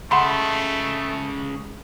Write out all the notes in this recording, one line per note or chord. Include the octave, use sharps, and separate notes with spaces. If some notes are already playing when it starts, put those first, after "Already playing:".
C#3 G#3 A3 F#5 B5 C6